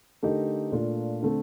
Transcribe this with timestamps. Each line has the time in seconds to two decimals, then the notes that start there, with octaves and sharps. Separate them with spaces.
0.23 D3 A3 D#4 G4 A#4
0.72 A#2 A3 D4 F4
1.23 D3 A3 C4